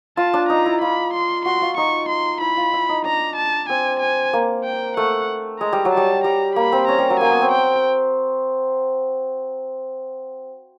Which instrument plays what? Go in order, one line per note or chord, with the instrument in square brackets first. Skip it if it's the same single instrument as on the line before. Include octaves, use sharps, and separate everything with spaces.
[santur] F4 [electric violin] A5
[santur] D4
[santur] D#4 [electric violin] A#5
[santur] E4
[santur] F4 [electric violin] B5
[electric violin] C6
[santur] F#4 [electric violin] C6
[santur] F4
[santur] D#4 [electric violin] C#6
[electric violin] C6
[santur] E4 [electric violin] B5
[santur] F4
E4
D#4
[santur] D4 [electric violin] A#5
[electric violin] A5
[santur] C4 [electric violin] G#5
[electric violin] G#5
[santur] A#3
[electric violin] G5
[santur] A3 [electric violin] F#5
[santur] G#3 [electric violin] A#5
[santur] G3
F#3
[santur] G3 [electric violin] A5
[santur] G3 [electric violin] A#5
[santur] A#3 [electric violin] B5
[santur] C4
[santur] C#4 [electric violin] A#5
[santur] G3
F#3
[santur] A#3 [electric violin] G#5
[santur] B3
C4
[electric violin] G5